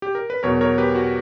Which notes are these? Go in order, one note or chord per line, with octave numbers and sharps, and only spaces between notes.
G4
A#4
B4
E2 B2 F#3 A#4 C#5
A#4 C#5
G4 B4
F#4